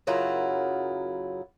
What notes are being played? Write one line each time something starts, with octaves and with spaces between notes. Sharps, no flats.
F#2 C#3 F#3 E4 F4 A#4